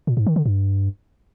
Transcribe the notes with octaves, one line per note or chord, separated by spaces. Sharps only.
A#2
G#2
D#3
D3
G2